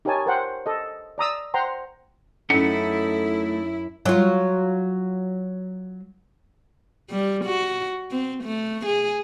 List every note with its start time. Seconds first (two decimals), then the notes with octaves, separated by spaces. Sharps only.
0.05 D#4 G4 A#4 C#5 G#5 A5
0.26 A#4 C5 F#5 G5
0.66 A4 D#5
1.18 D5 A#5 D#6 E6
1.54 C5 F#5 G5 A#5 C6
2.50 F#2 A3 C#4 D#4 E4 A4 F#5
4.06 F#3 F4
7.10 G3
7.44 F#4
8.11 C4
8.43 A3
8.85 G#4